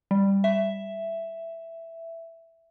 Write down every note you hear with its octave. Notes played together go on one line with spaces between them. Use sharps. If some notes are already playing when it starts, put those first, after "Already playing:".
G3
E5